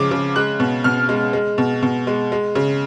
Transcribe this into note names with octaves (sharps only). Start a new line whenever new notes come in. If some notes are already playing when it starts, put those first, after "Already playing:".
Already playing: C#3 F3 G#3 D6
C#3
G#3 F#6
B2
B2 F6
G#3
G#3
B2
B2
G#3
G#3
C#3